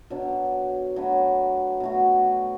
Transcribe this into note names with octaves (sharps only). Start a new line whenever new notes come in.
B2 F#3 D4
F#3 A3 D4 B4
B2 A3 F#4